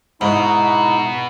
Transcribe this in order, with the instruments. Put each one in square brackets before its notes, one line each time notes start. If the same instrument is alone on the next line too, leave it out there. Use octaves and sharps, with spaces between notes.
[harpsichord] G#2 [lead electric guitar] B2 F#4 [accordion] D#4 E4